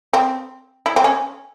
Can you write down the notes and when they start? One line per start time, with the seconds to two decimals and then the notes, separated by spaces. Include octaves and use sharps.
0.13 C4
0.86 E4
0.96 C4
1.04 C#4